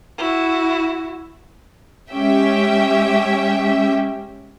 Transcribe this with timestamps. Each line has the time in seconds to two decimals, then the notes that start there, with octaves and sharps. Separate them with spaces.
0.18 E4 F#4
2.12 G#3 C#4 G4 E5 G5